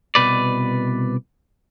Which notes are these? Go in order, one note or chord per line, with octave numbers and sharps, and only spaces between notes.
C2 B2 B4 D5